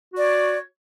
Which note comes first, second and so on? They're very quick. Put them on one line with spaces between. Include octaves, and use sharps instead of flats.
F#4 D5 C#5